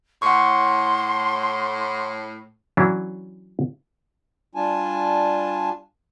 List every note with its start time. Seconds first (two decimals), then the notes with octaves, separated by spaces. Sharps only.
0.22 A2 F#5 C6 C#6
2.77 E3 F#3 C#4 D4 E4
4.55 G3 D4 F4 G#5 A5